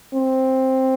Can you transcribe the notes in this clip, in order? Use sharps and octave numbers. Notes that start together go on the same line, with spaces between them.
C4